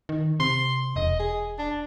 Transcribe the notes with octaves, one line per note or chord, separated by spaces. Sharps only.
D#3
C3 C6
E1 D#5
G#4
D4